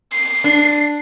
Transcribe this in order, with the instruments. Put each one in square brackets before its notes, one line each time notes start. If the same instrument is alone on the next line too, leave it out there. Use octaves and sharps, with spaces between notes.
[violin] C7
[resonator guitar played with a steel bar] D4